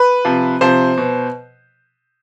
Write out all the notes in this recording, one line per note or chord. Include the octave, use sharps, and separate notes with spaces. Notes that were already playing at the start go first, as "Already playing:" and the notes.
Already playing: B4
C3 F3
C3 F3 C5
B2